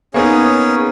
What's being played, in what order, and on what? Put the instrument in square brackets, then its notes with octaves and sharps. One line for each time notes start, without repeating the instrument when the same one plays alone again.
[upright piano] A#3 B3 D#4 [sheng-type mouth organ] C#4 G#4 C#5